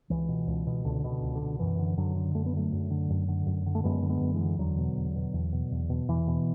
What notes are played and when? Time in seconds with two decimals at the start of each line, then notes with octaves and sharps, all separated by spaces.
0.10 C#2 E3
0.29 B2
0.48 C#2
0.67 B2
0.85 C#2 D3
1.04 B2
1.10 D3
1.23 C#2
1.35 D3
1.42 B2
1.59 F#2 E3
1.79 D3
1.97 F#2 D3 F#3
2.16 D3
2.35 F#2 A3
2.46 B3
2.53 D3 F#3 A3
2.72 F#2
2.91 D3
3.10 F#2
3.28 D3
3.46 F#2
3.66 D3
3.75 A3
3.84 F#2 G#3 B3
4.02 D3
4.09 G#3 B3
4.21 F#2
4.34 E3 G#3
4.41 D3
4.59 E2 D3 F#3
4.78 B2
4.97 E2
5.16 B2
5.34 E2
5.53 B2
5.72 E2
5.90 B2
6.08 E2 E3
6.27 B2